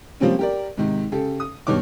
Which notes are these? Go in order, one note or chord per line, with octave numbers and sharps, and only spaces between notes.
F3 G3 A#3 C4 C#4
G4 A#4 D5
G#2 C3 D#3
C#3 G4 A4
D#6
G2 B2 D#3 C#5 D6